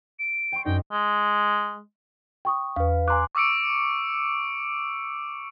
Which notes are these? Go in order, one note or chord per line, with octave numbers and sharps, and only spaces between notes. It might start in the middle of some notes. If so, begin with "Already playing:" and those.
D7
G5 C6 C#6
F#2 D#4 D5 G5
G#3
G5 C#6 D#6
E2 B4 F5
G#5 A#5 C6 D6 F#6
C#6 D6 E6 C#7 D7